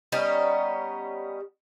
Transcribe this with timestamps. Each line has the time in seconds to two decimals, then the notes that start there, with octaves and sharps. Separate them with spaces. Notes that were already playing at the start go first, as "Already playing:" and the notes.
0.12 G3 B3 C#4 D#4